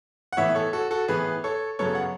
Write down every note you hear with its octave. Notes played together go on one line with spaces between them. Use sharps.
F#5
A2 E3 B3 C#5 E5
A4 C#5
F#4 A4
F#4 A4
A2 E3 B3 G#4 B4
A4 C#5
F#2 C#3 F#3 B3 A4 C#5
F#5